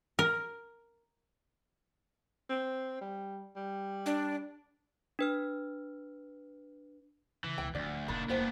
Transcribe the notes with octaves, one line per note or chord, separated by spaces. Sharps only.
A#4
C4
G3
G3
D4
D4 B4 F6
C#3 E3
C#2 B2 G5
D1 D2 F3 D5
F1 A2 D#3 A#3 D4 B5
F1 D2 B3 D4 E4 C5 G5